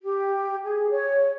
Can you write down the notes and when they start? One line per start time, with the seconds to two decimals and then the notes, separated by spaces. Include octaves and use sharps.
0.01 G4
0.64 G#4
0.90 C#5